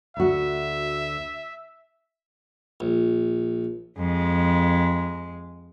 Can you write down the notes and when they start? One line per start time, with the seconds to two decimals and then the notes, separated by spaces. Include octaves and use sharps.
0.17 D2 F#4 E5
2.80 A#1
3.98 F2 G#3